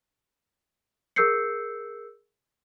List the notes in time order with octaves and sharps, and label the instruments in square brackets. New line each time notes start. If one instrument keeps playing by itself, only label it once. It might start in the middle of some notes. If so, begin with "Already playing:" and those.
[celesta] G#4 A#4 E6 G6 C7 C#7